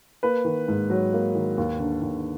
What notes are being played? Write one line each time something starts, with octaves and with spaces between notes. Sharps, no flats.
A#3 B4
D#3
G#2
F#3
A#3
D#3
D#2
D3
D#2